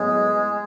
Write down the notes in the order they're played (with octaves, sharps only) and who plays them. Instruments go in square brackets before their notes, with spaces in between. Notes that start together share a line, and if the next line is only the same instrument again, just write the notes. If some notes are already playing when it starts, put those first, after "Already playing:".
Already playing: [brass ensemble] A2 F#3 B3 [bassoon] G#3